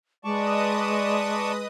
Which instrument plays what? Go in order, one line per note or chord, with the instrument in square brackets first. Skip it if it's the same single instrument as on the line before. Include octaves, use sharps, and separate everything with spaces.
[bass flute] G#3 [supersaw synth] B4 D#5 D#6 [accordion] D5 A5 C#6